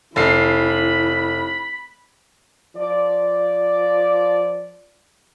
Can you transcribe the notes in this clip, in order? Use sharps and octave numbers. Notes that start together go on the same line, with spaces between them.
F1 E4 B5 C7
F3 D5